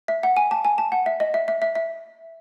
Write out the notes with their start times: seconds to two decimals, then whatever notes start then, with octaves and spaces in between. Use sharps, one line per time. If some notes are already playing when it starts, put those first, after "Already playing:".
0.08 E5
0.23 F#5
0.37 G#5
0.51 A5
0.65 G#5
0.78 A5
0.92 F#5
1.06 E5
1.20 D#5
1.34 E5
1.48 E5
1.62 E5
1.75 E5